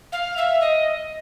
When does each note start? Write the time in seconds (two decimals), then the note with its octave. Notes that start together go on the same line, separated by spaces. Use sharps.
0.12 F5
0.37 E5
0.61 D#5